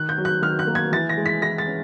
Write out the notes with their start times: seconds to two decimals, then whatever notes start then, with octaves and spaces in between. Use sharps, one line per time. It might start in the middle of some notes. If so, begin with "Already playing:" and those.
Already playing: D#3 F#6
0.09 G6
0.18 F#3
0.25 F#6
0.42 D#3 F6
0.59 F#6
0.67 A#3
0.75 G#6
0.92 E3 A6
1.09 A#6
1.17 G#3
1.26 B6
1.42 E4 A#6
1.58 A6
1.67 C#4